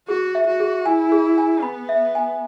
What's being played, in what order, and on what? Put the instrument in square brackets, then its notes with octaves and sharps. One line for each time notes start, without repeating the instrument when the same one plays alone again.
[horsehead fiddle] F#4 [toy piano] G#4
[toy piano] E5
[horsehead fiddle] F#4
[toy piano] G#4
[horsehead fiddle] E4 [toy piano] G#5
[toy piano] G#4
G#5
[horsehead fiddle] B3 [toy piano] B5
[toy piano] E5
G#5